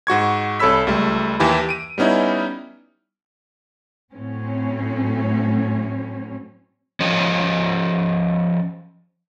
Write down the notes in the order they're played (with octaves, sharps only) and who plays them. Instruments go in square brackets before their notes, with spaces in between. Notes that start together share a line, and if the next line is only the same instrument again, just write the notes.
[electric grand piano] G#2 F#4 C#6 G#6
C2 A4 C#5 B5 E6 B6
C#2 G3 A3
D#2 E3 E4 G4 G#5 B5
D7 D#7
G3 B3 C#4 D#4 E4
[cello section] A2 F#3 C4 C#4
[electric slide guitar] F3 C#4 D#5